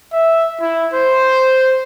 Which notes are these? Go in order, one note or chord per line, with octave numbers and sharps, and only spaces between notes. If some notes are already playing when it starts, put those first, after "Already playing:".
E5
E4
C5